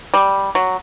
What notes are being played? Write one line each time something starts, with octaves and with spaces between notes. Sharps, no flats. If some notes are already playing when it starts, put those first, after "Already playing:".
G3
F#3